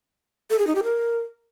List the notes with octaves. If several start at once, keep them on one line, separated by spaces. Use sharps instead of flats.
A4
G#4
D#4
G4
A#4